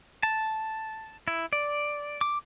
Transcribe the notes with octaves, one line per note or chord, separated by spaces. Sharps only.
A5
E4
D5
D6